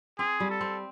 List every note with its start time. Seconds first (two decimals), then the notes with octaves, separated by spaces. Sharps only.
0.19 C4 G#4
0.40 G3
0.50 A4
0.61 C4